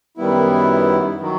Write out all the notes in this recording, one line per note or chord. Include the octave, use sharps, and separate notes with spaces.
F#2 D#3 G3 B3 E4
D#3 F#3